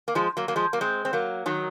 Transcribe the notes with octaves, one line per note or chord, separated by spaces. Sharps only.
A#3
F3 G#3
F#3 A#3
F#3 A#3
F3 G#3
F#3 A#3
G#3 C4
C4
F#3 A#3
D#3 F#3